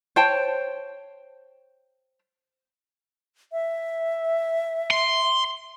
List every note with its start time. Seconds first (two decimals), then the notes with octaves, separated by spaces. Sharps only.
0.16 C5 C#5 G5 A5
3.52 E5
4.91 C6